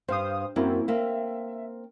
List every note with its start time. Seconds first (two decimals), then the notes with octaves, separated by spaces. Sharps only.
0.08 G2 C5 F5 D#6
0.56 F#2 A#3 C4 E4
0.88 A#3 C4 E5